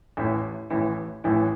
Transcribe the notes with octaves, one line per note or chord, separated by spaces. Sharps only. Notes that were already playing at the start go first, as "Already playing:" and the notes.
A1 A2 E3
A1 A2 E3
A1 A2 E3